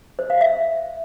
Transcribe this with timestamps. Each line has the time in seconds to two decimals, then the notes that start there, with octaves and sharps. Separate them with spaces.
0.19 C5
0.30 F5
0.41 E5